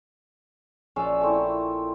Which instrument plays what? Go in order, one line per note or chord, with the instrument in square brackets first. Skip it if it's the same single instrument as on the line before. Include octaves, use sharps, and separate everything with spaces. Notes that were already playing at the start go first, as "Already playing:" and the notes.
[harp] A#1 D5 [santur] C#4 G#4 E6
[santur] A3 C4 E4